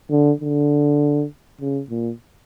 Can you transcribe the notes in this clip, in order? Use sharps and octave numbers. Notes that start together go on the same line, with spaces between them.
D3
D3
C#3
A#2